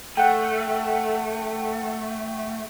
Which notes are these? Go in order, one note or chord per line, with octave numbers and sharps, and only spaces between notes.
A3 F#5 G5